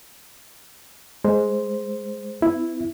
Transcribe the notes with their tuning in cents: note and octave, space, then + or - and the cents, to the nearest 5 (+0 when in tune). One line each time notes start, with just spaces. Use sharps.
G#3 +5 C5 +0
B3 +45 E4 +0